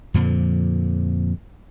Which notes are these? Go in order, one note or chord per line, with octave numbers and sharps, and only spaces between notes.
F2 A#2 D3 F3